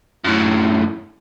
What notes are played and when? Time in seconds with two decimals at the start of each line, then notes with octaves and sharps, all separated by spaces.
0.25 F#2 A2